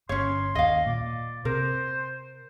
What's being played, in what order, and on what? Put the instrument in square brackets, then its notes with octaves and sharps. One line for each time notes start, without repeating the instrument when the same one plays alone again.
[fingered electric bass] G1 [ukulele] C#4 C#5 [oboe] C6
[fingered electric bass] D#2 [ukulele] D#5 F5
[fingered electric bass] A#2 [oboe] D5
[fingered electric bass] C3 [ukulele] A#4 [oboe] C5